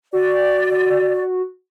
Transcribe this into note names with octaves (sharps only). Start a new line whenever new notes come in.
F#4 D5